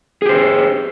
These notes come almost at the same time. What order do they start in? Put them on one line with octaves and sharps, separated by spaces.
G#4 G4 C5